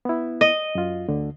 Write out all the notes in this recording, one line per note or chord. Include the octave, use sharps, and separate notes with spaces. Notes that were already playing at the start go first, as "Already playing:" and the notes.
B3 E4
D#5
F#2 F4
D2 D3